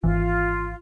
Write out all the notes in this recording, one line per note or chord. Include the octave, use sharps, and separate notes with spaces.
G#1 E3 F4